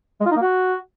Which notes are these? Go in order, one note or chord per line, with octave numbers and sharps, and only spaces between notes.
G#3
F4
D#4
A#3
F#4